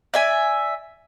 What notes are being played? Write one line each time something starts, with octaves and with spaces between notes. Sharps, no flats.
D5 E5 G#5